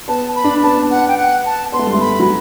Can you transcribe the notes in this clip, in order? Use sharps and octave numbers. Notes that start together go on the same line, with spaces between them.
B3 A5
B5
D4
B3 A5
F#5
G5
F#5
A5
B3 C6
A3
G3
A3
B5
F#3